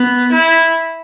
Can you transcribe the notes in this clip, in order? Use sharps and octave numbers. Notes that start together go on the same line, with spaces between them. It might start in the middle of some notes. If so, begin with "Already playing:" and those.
Already playing: B3
E4